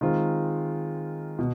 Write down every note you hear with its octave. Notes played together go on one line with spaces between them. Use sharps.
D#3 G#3 C4 F4
B2